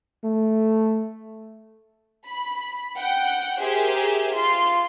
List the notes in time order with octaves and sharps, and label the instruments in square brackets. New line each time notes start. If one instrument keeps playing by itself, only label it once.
[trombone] A3
[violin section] B5
F#5 G5
G4 G#4 A#4 C5 E5
F4 C6